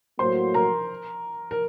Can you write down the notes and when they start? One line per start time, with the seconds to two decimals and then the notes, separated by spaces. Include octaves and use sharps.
0.19 A2 F#3 A#3 F#4 C5 C6
0.54 A#4 A#5
1.51 A#4